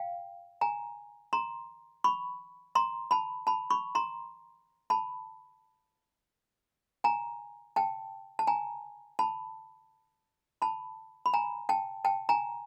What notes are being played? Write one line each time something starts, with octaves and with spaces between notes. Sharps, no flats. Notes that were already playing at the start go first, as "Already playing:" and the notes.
Already playing: F5 G5
G#5 A#5
A#5 C6
B5 C#6
A#5 C6
A5 B5
A5 B5
B5 C#6
A#5 C6
A5 B5
G#5 A#5
G5 A5
A5
G#5 A#5
A5 B5
A5 B5
B5
G#5 A#5
G5 A5
G5 A5
G#5 A#5